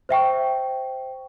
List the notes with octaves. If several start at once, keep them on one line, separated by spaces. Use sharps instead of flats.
C5 E5 G5 C#6